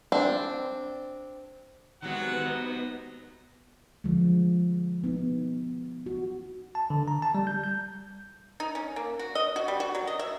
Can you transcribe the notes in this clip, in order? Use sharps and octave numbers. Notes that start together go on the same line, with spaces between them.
C4 D4
C3 D#3 F#3 G#3 B3 F#5
D#4
D3 F3 G#3
B3 D#4
F#4
A5
D3
A#5
A5
G3
G6
G6
D#4
C#4
A#3
F#4
D#5
F#4
G3
F#4
F#3
D#5
E5